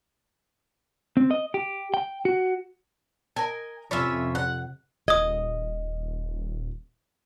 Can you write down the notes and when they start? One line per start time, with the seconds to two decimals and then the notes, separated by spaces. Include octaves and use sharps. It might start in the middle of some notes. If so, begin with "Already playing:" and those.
1.17 C4
1.31 D#5
1.54 G4
1.94 G5
2.25 F#4
3.36 A4 A#4 D#5 G#5
3.91 F2 C3 C#4 F4 C#5 E5 B5
4.35 F#5
5.08 D#1 D#5 D#6 G#6